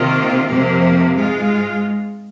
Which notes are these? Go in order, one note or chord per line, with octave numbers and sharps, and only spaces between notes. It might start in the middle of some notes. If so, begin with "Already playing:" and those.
Already playing: C3 D#3 A#3 F4
F2 C3 F3 A#3
G#2 G#3 F4